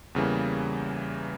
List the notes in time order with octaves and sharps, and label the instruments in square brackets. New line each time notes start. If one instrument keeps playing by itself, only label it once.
[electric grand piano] E2 C#3 E3 G3 A#3